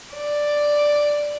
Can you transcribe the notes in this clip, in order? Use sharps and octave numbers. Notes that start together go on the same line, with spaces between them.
D5